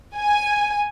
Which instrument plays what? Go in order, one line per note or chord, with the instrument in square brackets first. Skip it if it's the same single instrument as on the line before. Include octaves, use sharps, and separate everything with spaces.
[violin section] G#5